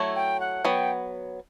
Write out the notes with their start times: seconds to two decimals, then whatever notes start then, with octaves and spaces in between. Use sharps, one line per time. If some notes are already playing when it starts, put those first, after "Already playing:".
Already playing: F#3 A3 E4
0.15 G5
0.40 F#5
0.64 F#3 B3 G5